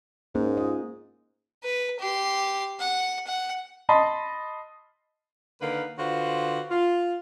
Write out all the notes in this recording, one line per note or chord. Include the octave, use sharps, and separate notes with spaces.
G#2 A#3 C#4
F4 D#5
B4
G4 C6
F#5
F#5
D#5 A5 B5 C6
D3 D#3 A#3 B4
D3 F4 F#4 B4 C5
F4